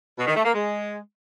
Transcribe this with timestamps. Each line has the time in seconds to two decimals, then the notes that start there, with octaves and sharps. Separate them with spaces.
0.18 B2
0.27 D#3
0.36 A3
0.45 A#3
0.54 G#3